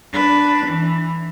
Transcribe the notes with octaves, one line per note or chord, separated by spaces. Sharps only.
D4 B4
E3